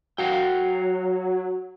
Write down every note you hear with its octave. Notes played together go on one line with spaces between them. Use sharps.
F#3 F#4 F5 G5